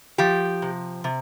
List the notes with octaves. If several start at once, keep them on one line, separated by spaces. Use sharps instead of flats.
F3 G4
C3
C3